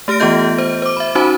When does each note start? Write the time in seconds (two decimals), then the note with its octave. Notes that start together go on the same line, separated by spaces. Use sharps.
0.08 A3 G4 F6 A#6 D7
0.20 E3 B3 F4 G4 D#5 G6
0.58 C5
0.82 C5 D6
0.97 E5 B5
1.15 C#4 D#4 F#4 C5 A5 B5